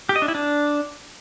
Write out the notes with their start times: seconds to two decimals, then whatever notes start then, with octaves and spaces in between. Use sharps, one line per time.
0.09 G4
0.16 D#5
0.22 D4
0.28 E4
0.35 D4